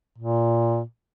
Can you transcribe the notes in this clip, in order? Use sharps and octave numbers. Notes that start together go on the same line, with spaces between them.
A#2